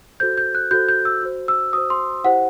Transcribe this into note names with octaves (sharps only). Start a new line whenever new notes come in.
F#4 A4 C5 G6
G6
F#6
F#4 A4 C5 G6
G6
E6
F#4 C5
E6
F#4 C5 D#6
C6
E4 G4 C5 F#5